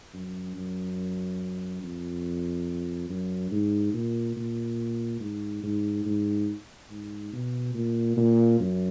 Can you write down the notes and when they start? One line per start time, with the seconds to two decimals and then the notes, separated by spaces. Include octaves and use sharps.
0.13 F#2
0.55 F#2
1.83 F2
3.09 F#2
3.51 G#2
3.94 A#2
4.36 A#2
5.20 G#2
5.63 G#2
6.06 G#2
6.90 G#2
7.33 B2
7.75 A#2
8.17 A#2
8.60 F#2